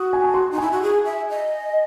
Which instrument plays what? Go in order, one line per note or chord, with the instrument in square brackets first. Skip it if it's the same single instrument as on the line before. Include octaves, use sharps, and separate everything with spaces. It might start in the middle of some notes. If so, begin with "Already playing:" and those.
Already playing: [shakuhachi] F#4 [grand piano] D#6
[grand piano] G#5
A5
C6
[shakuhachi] D#4
[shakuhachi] E4 [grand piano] G#5
[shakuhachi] F#4
G#4
E5
D#5